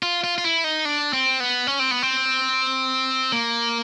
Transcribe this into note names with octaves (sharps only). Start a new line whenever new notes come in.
F4
F4
F4
E4
D#4
D4
C4
B3
C#4
C4
B3
C4
A#3